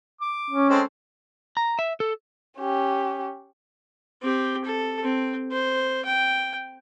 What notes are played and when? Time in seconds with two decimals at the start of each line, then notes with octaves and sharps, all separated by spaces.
0.21 D6
0.50 C#4
0.70 G#3 C4 A4
1.57 A#5
1.79 E5
2.00 A4
2.59 C#4 G4
4.22 C4 G4
4.65 A4
5.03 C4
5.52 C5
6.05 G5